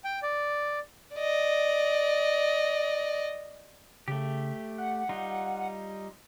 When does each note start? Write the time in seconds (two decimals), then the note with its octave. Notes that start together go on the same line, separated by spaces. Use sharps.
0.04 G5
0.23 D5
1.15 D5 D#5
4.08 C#3 A3 G4
4.78 F#5
5.09 G3 D#4 F4